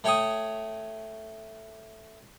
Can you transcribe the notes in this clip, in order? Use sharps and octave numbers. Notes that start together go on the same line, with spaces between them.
A3 C#5 G5 C#6 D#6